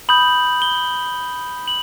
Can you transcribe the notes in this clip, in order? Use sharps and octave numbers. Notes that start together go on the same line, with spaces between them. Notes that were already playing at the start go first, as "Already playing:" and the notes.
B5 D#6 G6 F#7
G7
F#7